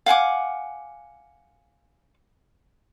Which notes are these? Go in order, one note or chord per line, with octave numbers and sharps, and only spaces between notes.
F5 F#5 G#5 D6